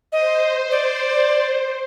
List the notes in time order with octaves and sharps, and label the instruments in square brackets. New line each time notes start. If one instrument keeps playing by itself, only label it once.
[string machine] C5 [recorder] D#5
[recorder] D5